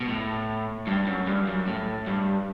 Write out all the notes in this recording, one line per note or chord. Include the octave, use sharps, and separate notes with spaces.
B2
A2
G2
F#2
G2
F#2
A2
G2